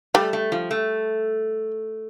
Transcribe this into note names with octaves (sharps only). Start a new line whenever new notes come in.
G3 A3
A3
F3
A3